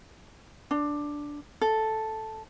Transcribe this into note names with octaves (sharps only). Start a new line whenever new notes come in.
D4
A4